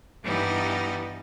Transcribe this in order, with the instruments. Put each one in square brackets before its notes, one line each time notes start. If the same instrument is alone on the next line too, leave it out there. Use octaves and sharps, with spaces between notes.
[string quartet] G2 E3 G3 B3 D#4